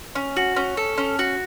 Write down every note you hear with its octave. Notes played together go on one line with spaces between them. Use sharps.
C#4
F#4
C#4
A4
C#4
F#4